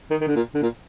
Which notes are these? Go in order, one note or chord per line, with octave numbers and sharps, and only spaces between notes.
D#3
D#3
D3
A#2
D3
A#2